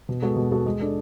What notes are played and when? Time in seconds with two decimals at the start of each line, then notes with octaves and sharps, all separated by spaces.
0.09 B2
0.22 G#3 B3 F#4 A4
0.36 B2
0.51 G#3 B3 F#4 A4
0.66 G#3
0.80 D4 A4 D5